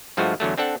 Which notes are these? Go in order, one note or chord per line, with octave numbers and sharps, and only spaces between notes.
G2 F3 G#3 A3 F4 F#4
E2 D3 F#3 A3
C4 D4 A4 F#5